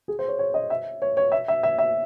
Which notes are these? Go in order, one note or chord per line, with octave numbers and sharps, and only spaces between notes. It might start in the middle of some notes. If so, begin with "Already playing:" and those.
G#4
C5
C#5
C#5
D#5
E5
C#5
C#5
E5
E5
E5
E5